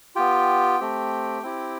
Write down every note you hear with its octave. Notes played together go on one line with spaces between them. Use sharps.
B3 F4 G4 G5
A3 C4 G4
C4 E4 G4